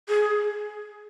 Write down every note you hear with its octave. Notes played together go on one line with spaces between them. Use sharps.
G#4